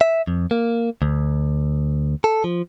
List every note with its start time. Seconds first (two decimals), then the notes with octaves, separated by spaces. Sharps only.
0.01 E5
0.27 F2
0.51 A#3
1.02 D2
2.24 A4
2.44 F3